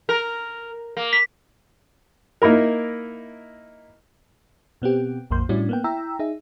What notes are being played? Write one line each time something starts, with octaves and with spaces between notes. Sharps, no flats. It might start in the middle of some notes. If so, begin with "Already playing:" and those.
A#4
A#3
B6
A#3 D#4 E4 A#4
B2 B3 C4 G4
A#1 F2 A#3 C6 G6
A2 G3 C#4 D4 E4 F#4
A#3 B3 G5
E4 G5 A#5 E6
D#4 G#4 E5